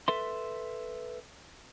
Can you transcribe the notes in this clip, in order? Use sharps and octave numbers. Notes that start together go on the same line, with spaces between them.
A4 B4 E5 C6